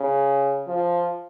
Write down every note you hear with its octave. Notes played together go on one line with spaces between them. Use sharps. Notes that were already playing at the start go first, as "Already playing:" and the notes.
Already playing: C#3
F3